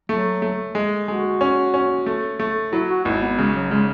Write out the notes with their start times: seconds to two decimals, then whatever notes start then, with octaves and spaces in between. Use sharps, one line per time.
0.09 F#3 A3
0.42 A3
0.75 G#3
1.08 G#3 F#4
1.41 C#4
1.74 C#4
2.06 A3
2.40 A3
2.72 F#3 E4
2.90 F#4
3.05 G#1 E4
3.21 B3
3.38 C#3 G#3
3.55 F#3
3.71 C#3 G#3